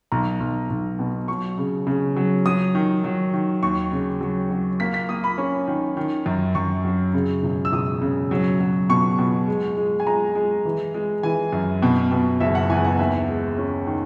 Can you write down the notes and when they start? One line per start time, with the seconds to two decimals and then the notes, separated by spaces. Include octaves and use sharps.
0.12 B1 A#5
0.40 B1
0.70 B1
0.99 B2
1.28 F#3 C#6
1.58 C#3
1.87 C#3
2.16 F#3
2.46 F#3 D#6
2.75 D#3
3.04 F#3
3.34 D#3
3.63 D#2 C#6
3.92 C#3
4.21 F#3
4.51 F#3
4.80 A#3 B6
4.94 B6
5.09 A#3 D#6
5.24 B5
5.38 C#4
5.68 D#3
5.97 D#3
6.26 F#2
6.55 F#2 C#6
6.85 F#3
7.14 C#3
7.43 E1
7.65 E6
7.72 E1 D#6
8.02 C#3
8.31 F#3
8.60 F#3
8.89 B2 C#6
9.19 B2
9.48 G#3
9.77 G#3
10.00 G#5
10.07 G#3 A#5
10.35 G#3
10.65 E3
10.94 G#3
11.23 E3 G#5
11.53 F#2
11.82 B2
12.12 B2
12.40 F#1 E5
12.55 F#5
12.70 E2 G#5
12.84 F#5
12.99 D#2 E5
13.28 G#3
13.58 C#4
13.87 D#3